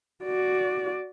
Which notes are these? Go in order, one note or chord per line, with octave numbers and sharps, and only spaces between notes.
F#4 D5